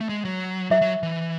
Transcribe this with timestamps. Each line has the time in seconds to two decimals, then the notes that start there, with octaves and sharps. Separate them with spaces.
0.01 A3
0.09 G#3
0.25 F#3
0.71 F#3 E5
0.81 F#3
1.03 E3